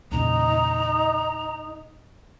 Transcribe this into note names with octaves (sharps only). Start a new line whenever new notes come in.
E2 A#2 C#3 D#4 A#5